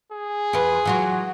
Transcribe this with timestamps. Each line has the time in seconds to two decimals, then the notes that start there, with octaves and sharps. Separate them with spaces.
0.12 G#4
0.53 E2 F4 B4
0.85 E3 F#3 F4 F#4